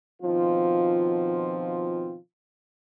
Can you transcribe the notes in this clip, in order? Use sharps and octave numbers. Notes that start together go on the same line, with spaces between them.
B2 D#3 F3 C4 F4